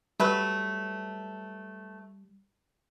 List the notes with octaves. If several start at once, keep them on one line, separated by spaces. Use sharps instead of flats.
F#3 G3 A3 B4